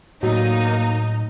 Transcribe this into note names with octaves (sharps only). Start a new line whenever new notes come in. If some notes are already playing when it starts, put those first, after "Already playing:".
A2 F#3 A#3 D#4